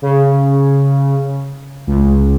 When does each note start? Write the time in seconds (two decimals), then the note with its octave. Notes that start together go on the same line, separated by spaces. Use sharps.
0.02 C#3
1.87 C#2